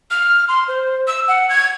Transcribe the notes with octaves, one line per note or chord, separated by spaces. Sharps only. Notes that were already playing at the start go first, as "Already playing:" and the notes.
F6
C6
C5
E6
F#5
G#6